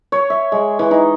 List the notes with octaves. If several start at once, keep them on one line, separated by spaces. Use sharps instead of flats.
C#5
E5
G#3
E3
D#4